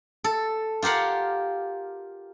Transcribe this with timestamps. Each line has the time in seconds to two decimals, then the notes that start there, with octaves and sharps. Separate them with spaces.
0.24 A4
0.82 F4 G4 A#4 F5 F#5